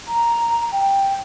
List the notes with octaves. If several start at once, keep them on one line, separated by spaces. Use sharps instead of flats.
A#5
G5